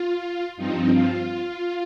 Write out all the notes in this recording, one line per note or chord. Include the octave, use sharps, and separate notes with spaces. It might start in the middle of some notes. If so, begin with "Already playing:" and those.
Already playing: F4
G2 F3 C4 D#4
F4